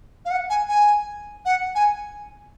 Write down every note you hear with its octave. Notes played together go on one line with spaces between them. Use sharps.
F5
F#5
G#5
G#5
F#5
G#5